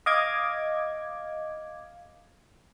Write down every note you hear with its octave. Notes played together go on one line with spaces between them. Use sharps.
D#5 F5 D6 G#6